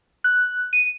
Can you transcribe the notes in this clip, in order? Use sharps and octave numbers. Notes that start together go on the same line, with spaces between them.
F#6
D#7